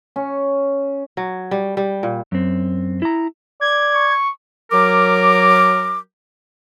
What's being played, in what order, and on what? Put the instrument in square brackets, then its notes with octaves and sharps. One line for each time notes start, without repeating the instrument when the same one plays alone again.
[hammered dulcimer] C#4
[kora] F#3
G3
G3
A#2
[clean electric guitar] F#2 C4
E4 A#5
[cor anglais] D5 [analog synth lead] G#6
[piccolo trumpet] C#6
[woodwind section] F#3 A#4 D6